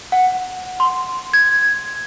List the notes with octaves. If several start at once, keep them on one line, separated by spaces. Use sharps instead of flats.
F#5
C6
G#6